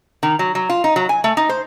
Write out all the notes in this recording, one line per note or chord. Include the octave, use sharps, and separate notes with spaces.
D#3
F#3
F#3
F4
D#4
F#3
G#5
A3
D#4
C5